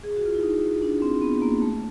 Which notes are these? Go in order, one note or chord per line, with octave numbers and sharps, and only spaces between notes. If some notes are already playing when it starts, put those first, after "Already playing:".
G#4
F#4
F4
E4
D#4
D4
C4
B3
A#3
A3